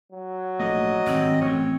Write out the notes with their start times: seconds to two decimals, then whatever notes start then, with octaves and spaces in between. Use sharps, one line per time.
0.12 F#3
0.59 A#1 A3 D#5
1.07 G#1 G2 C4
1.41 A1 A2 C#5